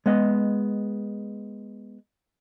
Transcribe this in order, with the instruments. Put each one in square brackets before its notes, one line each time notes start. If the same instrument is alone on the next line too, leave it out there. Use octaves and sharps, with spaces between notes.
[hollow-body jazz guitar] G#3 B3 D#5